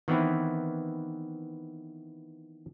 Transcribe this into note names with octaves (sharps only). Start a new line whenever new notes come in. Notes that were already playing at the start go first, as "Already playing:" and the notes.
D#3 E3 B3 C4 E4